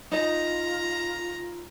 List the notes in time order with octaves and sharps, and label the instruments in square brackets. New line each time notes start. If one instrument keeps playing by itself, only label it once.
[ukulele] D#4 D#5 [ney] F4 [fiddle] A#5